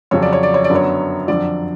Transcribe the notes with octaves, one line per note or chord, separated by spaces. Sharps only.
F2 C#3 F#3 C#4 C#5
D5
C#5
D5
C#5
D5
F#2 D3 F#3 B3
C#5
F2 D3 F#3 D5